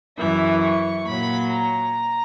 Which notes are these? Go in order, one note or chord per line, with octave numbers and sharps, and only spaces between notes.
F#2 E3 E5
C#6
A#2 F#3 B5
A#5